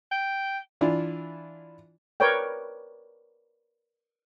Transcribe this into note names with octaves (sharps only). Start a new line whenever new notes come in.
G5
E3 D4 E4 F4
A#4 B4 C#5 D5 G5